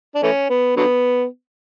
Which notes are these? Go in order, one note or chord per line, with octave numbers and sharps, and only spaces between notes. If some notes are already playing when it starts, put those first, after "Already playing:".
D4
E3 A3 C#4
B3
D3 F#3 B3